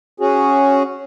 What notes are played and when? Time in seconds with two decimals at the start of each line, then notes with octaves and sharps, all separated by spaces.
0.20 C#4 F#4 G#4